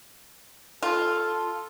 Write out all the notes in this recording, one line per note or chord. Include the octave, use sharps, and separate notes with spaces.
F4 A4